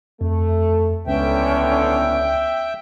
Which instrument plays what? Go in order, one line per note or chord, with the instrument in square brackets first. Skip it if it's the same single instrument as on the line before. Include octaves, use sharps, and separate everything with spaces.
[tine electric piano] F2 [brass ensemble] A3
[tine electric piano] C#2 [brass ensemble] A2 D3 B3 [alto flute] C#4 [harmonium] E5 G5